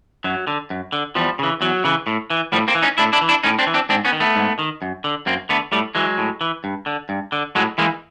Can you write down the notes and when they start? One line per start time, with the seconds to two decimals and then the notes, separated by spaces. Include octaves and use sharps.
0.24 F#2 F#3
0.47 D3
0.70 F#2
0.92 D3
1.15 E2 F3 G3
1.39 C#3 E3
1.61 E2 F#3
1.84 C#3 E3
2.07 A2
2.30 E3
2.52 A2 F3 G3
2.68 A#3 C4
2.75 E3
2.82 C#4 D#4
2.98 A2 D4 E4
3.13 D4 E4
3.21 E3
3.29 D4 E4
3.43 A2 C#4 D#4
3.59 C4 D4
3.67 E3
3.74 C4 D4
3.89 G#2 C4 D4
4.05 B3 C#4
4.12 D#3
4.20 A3 B3
4.36 G#2
4.59 D#3
4.82 F#2
5.04 D3
5.26 F#2 A#3 C4
5.49 D3 A3 B3
5.72 A2 G3 A3
5.95 E3 F#3 G#3
6.18 A2
6.41 E3
6.64 G2
6.86 D3
7.09 G2
7.32 D3
7.55 A2 F#3 G#3
7.78 E3 G#3 A#3